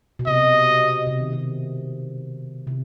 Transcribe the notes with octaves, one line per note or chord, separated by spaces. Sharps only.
B2
C3 D#5
C3
D#3
C3
C3